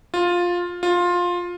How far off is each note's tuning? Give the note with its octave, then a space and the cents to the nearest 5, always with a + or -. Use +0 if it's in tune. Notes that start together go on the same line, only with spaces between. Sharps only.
F4 +10
F4 +15